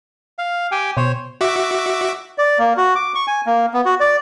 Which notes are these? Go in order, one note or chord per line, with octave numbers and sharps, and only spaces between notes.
F5
G4 G5 G#5
B2 C5 C#5
F#4 E5 D6
D5
A#3
F#4
D6
C#6
G#5
A#3
B3
F#4
D5